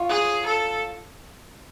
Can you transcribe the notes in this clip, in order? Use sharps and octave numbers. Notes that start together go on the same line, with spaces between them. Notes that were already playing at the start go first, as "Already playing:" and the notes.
Already playing: F4 C#5
G#4
A4